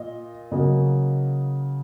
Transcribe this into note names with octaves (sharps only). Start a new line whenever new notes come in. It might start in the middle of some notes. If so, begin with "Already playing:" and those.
Already playing: A#2 D#5
C#3 F#3 A#3 D#5